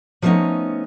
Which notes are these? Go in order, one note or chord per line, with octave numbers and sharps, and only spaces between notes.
F3 G3 A3 B3 C#4 D#4